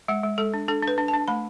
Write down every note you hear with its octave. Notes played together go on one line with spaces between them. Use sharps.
G#3 F#5
G#3
G#3 A4
D4
D4 A4
D4 B4
D4
A5
D4
A3 B5